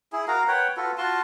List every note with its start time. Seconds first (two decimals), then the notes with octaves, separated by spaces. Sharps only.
0.13 E4 G#4
0.28 F#4 A#4 F5 A#5
0.48 B4 C#5 F#5 G5
0.77 F4 F#4 A4 B4
0.98 F4 F#4 A5 C6